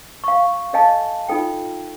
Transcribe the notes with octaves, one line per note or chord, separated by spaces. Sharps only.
F5 C#6
A4 C#5 D#5 F5 G#5 A5
D#4 F4 A4 G5